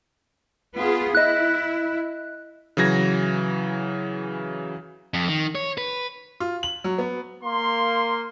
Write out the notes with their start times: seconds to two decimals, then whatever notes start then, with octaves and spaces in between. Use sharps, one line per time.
0.77 B3 F4 G#4
1.15 E4 D#5 F#6
2.77 C#3 E3 F#3 G#6 A#6
5.14 F2
5.28 D#3
5.55 C#5
5.78 B4
6.40 F4
6.63 F#7
6.84 F#3
6.98 B3
7.43 A#3 C6